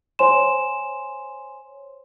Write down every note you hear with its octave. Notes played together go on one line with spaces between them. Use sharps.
C5 C#5 G#5 C6 E7